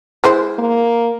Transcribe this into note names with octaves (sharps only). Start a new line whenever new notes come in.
G#3 E4 C5
A#3